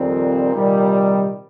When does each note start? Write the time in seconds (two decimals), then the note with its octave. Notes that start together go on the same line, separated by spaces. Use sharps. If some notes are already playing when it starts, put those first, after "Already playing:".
Already playing: F2 A#2 D#3 G3 C4
0.52 C3 D#3 G3